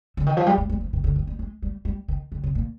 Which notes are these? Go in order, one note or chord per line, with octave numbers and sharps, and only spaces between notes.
D3
D#3
F3
G3
G#3
G3
F3
D#3
D3
D#3
G3
G#3
G3
G3
D#3
D3
C3
A#2